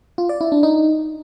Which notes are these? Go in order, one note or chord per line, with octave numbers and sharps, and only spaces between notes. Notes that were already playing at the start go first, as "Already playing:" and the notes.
F4
D5
E4
D4
D#4